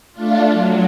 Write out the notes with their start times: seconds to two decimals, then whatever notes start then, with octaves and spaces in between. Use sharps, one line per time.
0.12 A3 D4 F4
0.52 F#3